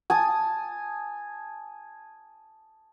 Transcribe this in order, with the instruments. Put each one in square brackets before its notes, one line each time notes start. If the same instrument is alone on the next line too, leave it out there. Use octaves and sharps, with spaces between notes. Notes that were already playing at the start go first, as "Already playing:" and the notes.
[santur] G#5 A5 D#6